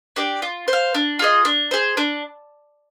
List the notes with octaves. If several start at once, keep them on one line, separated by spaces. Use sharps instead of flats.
D4 G4 D5
F4
C5
F5
D4
F4 G#4 D#5
D4
G#4 C5
D4